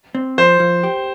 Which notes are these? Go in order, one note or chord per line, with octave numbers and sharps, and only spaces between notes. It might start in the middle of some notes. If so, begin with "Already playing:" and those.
C4
F3 C5
F3
G4